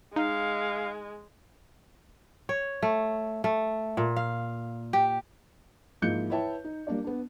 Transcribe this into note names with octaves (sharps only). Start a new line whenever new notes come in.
G#3 D#4 F5
C#5
A3
A3
A#2
F5
G4
G#2 F3 A#3 E4 G6 C#7
E4 B4 C#5 E5 G5 A5
D#4
G3 A#3 D4 D5
B3 D4